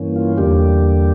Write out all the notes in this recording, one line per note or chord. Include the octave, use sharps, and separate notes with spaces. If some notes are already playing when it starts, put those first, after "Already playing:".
Already playing: G2 E3 A#3 C#4
F4
E2 D3 G3 A#3 G4